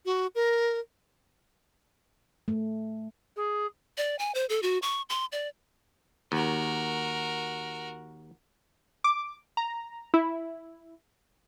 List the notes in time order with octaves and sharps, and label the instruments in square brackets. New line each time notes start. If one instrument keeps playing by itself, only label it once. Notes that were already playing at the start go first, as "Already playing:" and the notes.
[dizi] F#4
A#4
[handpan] A3
[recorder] G#4
[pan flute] D5
G#5
C5
A4
F#4
C#6
C6
D5
[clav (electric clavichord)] D#2 [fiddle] F#4 A#4
[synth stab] D6
A#5
E4